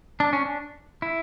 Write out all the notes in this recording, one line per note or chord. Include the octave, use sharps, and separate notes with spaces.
D4
C#4
D4
E4